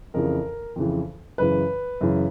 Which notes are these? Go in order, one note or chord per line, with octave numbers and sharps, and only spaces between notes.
F2 C#3 E3 A#4
F2 C#3 E3
F#2 C#3 E3 B4
F#2 C#3 E3